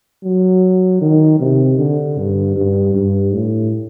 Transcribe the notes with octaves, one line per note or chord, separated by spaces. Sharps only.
F#3
D#3
C3
D3
G2
G2
G2
A2